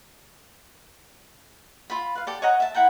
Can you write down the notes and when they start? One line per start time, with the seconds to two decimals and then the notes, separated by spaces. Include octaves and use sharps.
1.90 F4 B5
2.15 B4 F5
2.27 G4 A4 D5
2.42 C#5 D#5 F#5 A#5
2.60 E5 A5
2.75 E4 F#5 G5 A#5